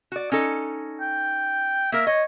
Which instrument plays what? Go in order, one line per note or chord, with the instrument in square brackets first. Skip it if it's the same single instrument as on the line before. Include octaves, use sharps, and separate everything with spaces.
[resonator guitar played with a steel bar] F#4 D5
C#4 D#4 A4
[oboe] G5
[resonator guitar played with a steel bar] A#3 A#4 [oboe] E5
[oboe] C#5 [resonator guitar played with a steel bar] D#5